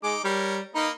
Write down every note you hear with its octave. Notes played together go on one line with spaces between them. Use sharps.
G#3 D#4 D6
G3 A#4 C#5
A#3 D#4 B4 D#5